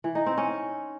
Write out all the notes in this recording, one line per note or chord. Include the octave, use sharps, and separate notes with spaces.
E3
D#4
C4
C#4